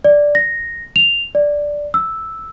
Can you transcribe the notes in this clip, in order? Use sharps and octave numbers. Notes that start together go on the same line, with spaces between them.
D5
A#6
F7
D5
E6